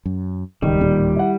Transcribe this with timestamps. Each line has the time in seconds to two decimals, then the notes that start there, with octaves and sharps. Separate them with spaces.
0.06 F#2
0.62 D1 C#2 D#3 G3
0.81 D1 D#2 A#2 D#3
1.16 E4 F#5